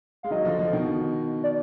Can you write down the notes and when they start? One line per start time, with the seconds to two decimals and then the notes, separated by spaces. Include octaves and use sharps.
0.23 G#3 F5
0.31 D#3 F#3 D#5
0.45 D3 F3
0.59 D3 F3
0.73 B2 D#3
1.43 D5